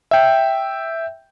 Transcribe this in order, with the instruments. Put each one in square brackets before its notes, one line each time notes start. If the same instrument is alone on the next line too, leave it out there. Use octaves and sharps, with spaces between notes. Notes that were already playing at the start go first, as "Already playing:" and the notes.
[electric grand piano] E5 G5